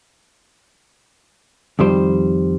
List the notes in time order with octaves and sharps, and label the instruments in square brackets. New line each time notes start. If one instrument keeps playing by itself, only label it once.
[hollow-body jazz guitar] F2 D#3 G3 C5